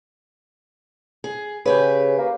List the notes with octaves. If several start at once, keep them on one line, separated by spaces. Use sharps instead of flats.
G#4
C#3 G4 G#4 B4
A#3